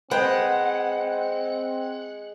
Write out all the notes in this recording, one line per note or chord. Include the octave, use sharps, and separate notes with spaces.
G#3 C4 B4 C5 F#5 G5